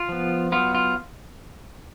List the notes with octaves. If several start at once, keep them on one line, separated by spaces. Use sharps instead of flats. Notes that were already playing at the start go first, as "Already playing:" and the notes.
Already playing: F4
F3 B3
F#3 B3 F4
F4